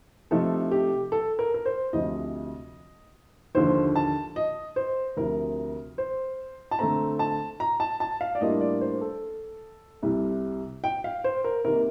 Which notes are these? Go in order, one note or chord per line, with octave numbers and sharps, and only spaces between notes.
C3 F3 A3 D#4 A4
G4
A4
A#4
A#4
C5
D2 C3 F3 D#5
D#2 D3 F3 C5
A5
D#5
C5
D2 C3 F3 A#4
C5
A5
D3 A3 C4 A#5
A5
A#5
A5
A5
F5
D5
A2 G3 A#3 D4 F4 D#5
D5
C5
A4
C2 C3 G3
G5
F5
C5
A#4
C3 D#3 A#3 A#4